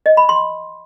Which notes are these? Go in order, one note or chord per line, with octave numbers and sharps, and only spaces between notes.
D#5
B5
C6